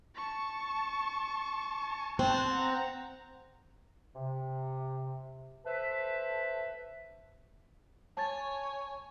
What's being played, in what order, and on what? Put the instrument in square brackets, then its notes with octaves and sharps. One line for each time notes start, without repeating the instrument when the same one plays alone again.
[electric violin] A5 C#6
[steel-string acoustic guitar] C4 [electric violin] A5 F#6
[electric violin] F#5 A#5
[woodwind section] C3
A4 B4 C5 E5
[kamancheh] C#5 G#5 [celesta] A5 A6